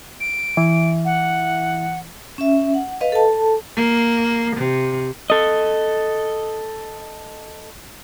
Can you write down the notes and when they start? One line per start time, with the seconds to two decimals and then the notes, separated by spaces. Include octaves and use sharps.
0.20 D7
0.57 E3
1.05 F#5
2.38 C#4 E5
2.74 F#5
3.01 B4 D#5 F5
3.12 A4 A5
3.77 A#3
4.56 C3
5.30 A4 D#5